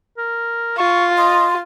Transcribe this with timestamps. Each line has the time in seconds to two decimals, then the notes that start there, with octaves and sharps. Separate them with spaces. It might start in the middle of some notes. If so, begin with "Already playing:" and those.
0.17 A#4
0.78 F4 C#6
1.17 D#5 C6